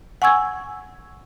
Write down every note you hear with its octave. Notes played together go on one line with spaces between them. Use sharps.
F#5 G#5 C#6 E6 G#6